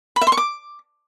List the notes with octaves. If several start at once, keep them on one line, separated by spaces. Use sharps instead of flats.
B5
E5
C6
C#6
D6